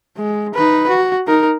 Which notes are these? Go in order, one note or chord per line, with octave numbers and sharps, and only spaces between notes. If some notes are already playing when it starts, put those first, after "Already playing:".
G#3
D#4 B4
F#4
D#4 A#4